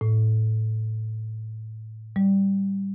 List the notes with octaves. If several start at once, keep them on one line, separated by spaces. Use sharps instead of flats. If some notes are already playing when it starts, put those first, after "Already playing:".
A2
G3